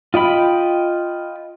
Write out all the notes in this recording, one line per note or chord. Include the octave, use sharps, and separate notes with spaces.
F4 D#5 G5 B5